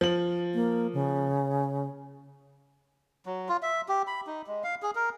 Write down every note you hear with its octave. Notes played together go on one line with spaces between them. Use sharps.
F3 F#7
A#3
C#3
F#3
F4
E5
G4
B5
D#4
G#3
F5
G#4
A#4